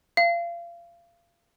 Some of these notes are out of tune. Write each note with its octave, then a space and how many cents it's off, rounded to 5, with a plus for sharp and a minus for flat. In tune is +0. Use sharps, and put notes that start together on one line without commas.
F5 -30